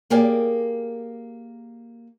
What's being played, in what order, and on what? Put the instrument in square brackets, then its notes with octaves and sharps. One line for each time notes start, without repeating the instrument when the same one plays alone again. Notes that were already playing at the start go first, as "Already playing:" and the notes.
[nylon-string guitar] A#3 G4 G#4 A#4 D5